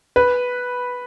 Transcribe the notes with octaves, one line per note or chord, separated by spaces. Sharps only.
B4